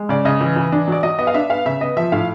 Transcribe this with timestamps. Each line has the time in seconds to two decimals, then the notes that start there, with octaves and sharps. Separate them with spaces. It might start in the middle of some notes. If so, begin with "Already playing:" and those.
Already playing: G#3
0.09 C#3 D5
0.25 C#3 D#5
0.41 E3
0.56 E3
0.72 D4
0.88 F#3 D5
1.03 F#3 D#5
1.19 B3 D#5
1.27 F5
1.34 D4 E5
1.50 B3 F5
1.66 C#3 E5
1.81 B3 D#5
1.97 F3 E5
2.12 A2 F5